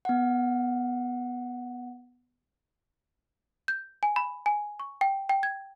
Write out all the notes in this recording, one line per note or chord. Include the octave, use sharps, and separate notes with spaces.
B3 F#5
G6
G#5
B5
G#5
C#6
G5
G5
G#6